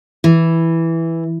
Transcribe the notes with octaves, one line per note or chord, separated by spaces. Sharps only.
E3